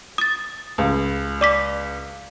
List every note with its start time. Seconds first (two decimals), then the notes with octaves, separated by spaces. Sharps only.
0.18 D#6 A6
0.78 C#2
1.41 D5 D6 B6